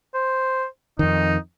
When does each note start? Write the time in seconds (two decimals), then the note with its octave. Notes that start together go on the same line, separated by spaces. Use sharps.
0.14 C5
0.99 F2 D#3 D#4